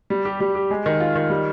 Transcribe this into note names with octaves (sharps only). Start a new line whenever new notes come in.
G3
G4
G3
G4
G#3
D#3
F4
D#3
G3